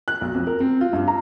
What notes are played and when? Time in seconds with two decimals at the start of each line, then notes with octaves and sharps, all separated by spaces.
0.08 F#6
0.21 B1
0.34 F2
0.47 A#4
0.60 C4
0.81 F4
0.93 G2
1.08 A#5